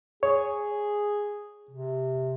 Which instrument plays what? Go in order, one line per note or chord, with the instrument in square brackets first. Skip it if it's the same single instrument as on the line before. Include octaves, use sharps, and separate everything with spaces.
[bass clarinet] G#4 [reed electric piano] C#5
[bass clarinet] C3